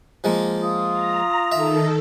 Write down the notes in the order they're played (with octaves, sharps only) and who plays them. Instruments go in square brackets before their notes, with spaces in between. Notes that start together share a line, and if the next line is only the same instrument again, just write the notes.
[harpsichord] F3 G#3 A#3
[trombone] F4 [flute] D#6
[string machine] A#5
[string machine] D#3 A4 [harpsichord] E5